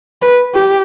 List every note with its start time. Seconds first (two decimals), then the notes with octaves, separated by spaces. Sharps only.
0.22 B4
0.54 G4